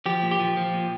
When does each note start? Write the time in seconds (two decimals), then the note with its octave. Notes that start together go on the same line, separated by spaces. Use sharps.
0.06 F3 G4
0.23 A#2
0.31 G4
0.40 F3
0.57 F3
0.74 A#2